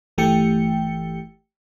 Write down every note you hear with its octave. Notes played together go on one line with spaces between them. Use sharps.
G1 E3 A3 G4 G5 C#7